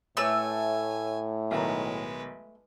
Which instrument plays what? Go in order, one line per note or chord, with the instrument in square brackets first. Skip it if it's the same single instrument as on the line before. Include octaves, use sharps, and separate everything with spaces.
[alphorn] A2 [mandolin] A3 E6 [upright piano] B4 C#5 D6 [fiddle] G#5
[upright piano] B1 D#3 A#5 [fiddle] G#3 B4